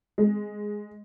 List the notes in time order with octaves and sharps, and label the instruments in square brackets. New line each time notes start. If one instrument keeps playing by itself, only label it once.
[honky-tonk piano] G#3